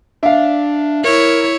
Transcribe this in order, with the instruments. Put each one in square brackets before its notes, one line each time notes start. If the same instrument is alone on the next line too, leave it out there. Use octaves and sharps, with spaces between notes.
[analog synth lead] D4 [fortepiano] E5 F5
[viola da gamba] E4 C#5 [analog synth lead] A#4